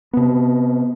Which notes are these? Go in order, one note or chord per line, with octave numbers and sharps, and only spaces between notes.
C3 B3